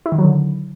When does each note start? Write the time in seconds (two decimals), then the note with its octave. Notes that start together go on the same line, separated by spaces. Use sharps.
0.06 E4
0.12 D#3
0.18 F#3
0.25 D3